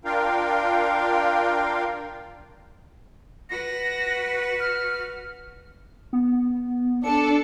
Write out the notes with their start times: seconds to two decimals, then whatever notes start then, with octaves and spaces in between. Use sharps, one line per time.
0.05 D4 F4 A#4 F5 G5
3.50 F#4 B4 A#6
4.60 F6
6.13 B3
7.04 D4 A4 C#7